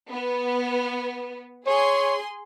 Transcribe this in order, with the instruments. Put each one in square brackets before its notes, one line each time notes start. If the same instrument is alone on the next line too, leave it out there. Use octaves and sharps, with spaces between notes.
[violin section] B3
[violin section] G#4 C6 [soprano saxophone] C#5